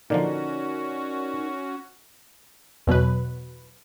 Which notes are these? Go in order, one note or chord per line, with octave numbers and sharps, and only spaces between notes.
A#2 D3 F3 C#4 D#4 F#4 A#4 D5
E2 B2 F#3 B4